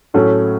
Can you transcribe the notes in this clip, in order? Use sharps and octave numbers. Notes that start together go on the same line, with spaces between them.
A2 F#3 A3 C#4